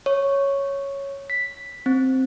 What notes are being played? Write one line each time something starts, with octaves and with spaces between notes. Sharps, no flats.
C#5
B6
C4